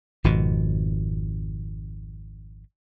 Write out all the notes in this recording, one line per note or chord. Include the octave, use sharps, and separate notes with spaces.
G#1 F2 B2